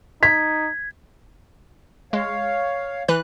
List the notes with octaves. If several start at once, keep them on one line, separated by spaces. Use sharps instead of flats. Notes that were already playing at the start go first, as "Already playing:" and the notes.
D#4 G#6 B6
G#3 C#5 F5
E3 B4 F#6